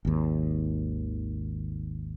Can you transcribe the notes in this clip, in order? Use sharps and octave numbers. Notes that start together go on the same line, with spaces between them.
G#1 D#2